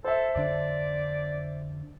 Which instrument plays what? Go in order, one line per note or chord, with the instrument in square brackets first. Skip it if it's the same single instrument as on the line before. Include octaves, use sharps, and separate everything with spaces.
[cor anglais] A4 [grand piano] C5 E5
[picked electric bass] F2 D3 D4 [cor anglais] D5